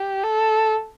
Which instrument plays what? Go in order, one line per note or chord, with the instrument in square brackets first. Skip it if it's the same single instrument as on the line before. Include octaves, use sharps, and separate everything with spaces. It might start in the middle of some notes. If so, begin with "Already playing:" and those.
Already playing: [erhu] G4
A4